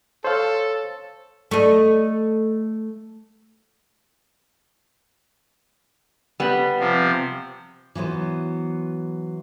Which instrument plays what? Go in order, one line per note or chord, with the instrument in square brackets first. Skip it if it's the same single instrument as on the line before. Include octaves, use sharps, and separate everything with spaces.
[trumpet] A4 [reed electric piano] C5 C#5 F5
[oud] A3 D#5
[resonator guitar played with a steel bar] G3 B3
[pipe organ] C3 F3
[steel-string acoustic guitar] E3 F#3 B3 C5